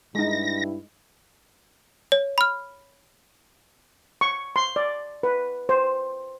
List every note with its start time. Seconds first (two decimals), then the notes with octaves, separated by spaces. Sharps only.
0.15 G2 G#3 D#4 E4 A#6
2.12 C#5
2.38 B5 F6
4.21 C#6
4.56 C6
4.76 D5
5.23 B4
5.69 C5